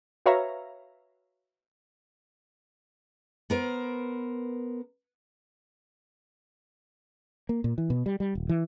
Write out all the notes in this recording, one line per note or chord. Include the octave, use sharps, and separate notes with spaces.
F#4 B4 C#5 E5 F5 A#5
B3 A#4 C5
A#3
A#2
E3
B2
G3
G3
D#1
E3